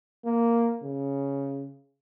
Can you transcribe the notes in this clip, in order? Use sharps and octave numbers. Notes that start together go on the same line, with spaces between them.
A#3
C#3